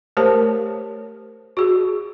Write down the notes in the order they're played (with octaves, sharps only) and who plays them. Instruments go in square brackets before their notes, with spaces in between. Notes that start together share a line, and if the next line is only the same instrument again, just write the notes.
[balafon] A3 G4 A#4 C5 C#5 A5
F#4 G#4